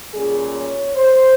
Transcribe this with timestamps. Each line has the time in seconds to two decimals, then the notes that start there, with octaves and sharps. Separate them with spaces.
0.14 A#2 G3 C#4 G#4
0.55 C#5
0.95 C5